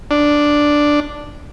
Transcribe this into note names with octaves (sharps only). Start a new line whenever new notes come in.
D4